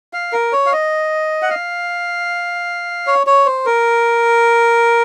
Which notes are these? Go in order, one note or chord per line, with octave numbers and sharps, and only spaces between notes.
F5
A#4
C#5
F5
D#5
F#5
F5
C#5
C#5
C5
A#4